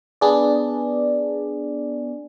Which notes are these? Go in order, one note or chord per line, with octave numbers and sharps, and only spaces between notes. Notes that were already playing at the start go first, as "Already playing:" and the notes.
B3 D4 G#4 D5